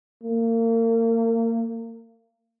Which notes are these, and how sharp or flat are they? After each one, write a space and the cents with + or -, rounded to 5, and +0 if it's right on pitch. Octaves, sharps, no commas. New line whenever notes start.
A#3 -35